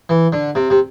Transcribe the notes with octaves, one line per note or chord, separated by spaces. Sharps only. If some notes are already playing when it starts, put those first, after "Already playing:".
E3
D3
C3
C3